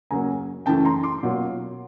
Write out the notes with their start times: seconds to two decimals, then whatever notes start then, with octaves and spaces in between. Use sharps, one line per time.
0.11 F#2 C#3 F#3 A#3 G#5 A#5
0.66 F#2 C#3 E3 A3 G5 A5
0.85 A#5 C6
1.03 C6 D6
1.23 B2 F#3 A#3 C#4 F4